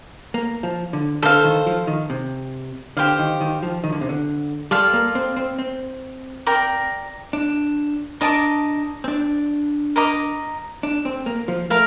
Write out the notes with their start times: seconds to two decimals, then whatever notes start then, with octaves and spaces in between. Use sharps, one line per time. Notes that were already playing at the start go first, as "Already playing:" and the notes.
0.34 A#3
0.63 F3
0.93 D3
1.22 D3 A4 C5 F5
1.44 D#3
1.66 F3
1.87 D#3
2.10 C3
2.97 D3 G4 C5 F5
3.19 D#3
3.41 D#3
3.63 F3
3.84 D#3
3.92 D3
4.01 C3
4.09 D3
4.71 G3 F4 A4 D5 F5
4.93 A#3
5.15 C4
5.36 C4
5.58 C4
6.47 A#4 D5 G5 A#5
7.33 D4
8.21 D4 A#4 D#5 A5 D6
9.04 C4
9.08 D4
9.96 A#4 D#5 A#5 D6
10.83 D4
11.05 C4
11.26 A#3
11.48 F3
11.70 A3 A#4 F5